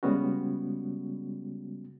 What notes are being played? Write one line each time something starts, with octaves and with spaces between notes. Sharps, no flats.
C#3 G3 G#3 B3 C#4 F#4